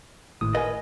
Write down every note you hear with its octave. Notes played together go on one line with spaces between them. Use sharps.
G#1 A2 D#6
A#4 B4 D#5 G#5